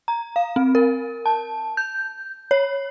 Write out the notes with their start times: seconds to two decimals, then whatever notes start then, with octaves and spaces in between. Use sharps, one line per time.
0.08 A#5
0.36 F5
0.56 C4
0.75 A#4
1.26 A5
1.77 G6
2.51 C#5